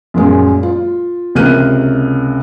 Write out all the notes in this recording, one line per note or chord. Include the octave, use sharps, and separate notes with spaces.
F#2 A#2 G#3
F4
C#2 C3 A#3 F6 F#6 D#7